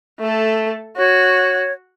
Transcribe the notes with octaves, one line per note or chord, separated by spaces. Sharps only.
A3 A4
F#4 C#5